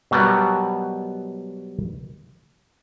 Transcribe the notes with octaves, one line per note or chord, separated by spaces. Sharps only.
B2 F#3 G3 B3 A#4